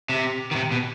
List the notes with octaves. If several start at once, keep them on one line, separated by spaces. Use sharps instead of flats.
C3
D#3
C3
B2